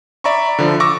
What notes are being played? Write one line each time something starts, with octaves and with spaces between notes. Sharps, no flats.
D5 E5 A#5 B5 C#6
D3 F3
C#6 D6 E6 A#6